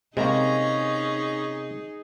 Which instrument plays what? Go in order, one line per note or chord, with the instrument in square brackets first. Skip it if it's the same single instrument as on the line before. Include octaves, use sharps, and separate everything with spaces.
[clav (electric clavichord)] C3 A#3 [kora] G#3 [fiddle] C#4 A#5 [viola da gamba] D#4 G#4